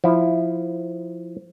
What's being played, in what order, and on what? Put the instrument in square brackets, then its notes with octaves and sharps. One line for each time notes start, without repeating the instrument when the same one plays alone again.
[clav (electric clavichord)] F3 E4